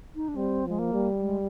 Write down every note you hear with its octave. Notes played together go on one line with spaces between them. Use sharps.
D#4
D4
G3 C4
F3 G#3
A#3
G3
G#3